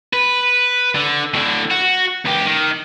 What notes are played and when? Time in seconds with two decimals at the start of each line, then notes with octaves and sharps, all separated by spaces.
0.13 B4
0.95 D3
1.34 A2 D3
1.71 F#4
2.25 C#2 G4
2.46 D#3